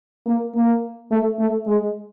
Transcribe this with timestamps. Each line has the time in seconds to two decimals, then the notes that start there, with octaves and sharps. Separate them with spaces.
0.26 A#3
0.54 A#3
1.11 A3
1.39 A3
1.67 G#3